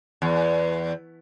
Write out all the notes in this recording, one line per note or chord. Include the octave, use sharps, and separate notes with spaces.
E2